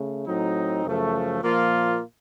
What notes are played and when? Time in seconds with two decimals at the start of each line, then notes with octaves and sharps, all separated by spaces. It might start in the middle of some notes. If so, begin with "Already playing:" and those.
Already playing: C#3 A3
0.26 A2 F#3 C4 D#4
0.85 F#2 C#3 F3 A3
1.43 A#2 F3 A#3 F4